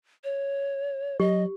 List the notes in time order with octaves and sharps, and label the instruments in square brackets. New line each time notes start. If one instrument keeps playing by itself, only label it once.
[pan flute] C#5
[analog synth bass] F#3 [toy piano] G4 [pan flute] D#5